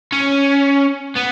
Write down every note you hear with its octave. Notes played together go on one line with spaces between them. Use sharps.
C#4
B3